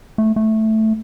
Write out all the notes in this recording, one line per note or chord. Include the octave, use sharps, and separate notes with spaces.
A3
A3